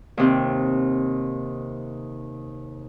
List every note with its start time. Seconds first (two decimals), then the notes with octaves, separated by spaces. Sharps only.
0.17 D#2 C3 C4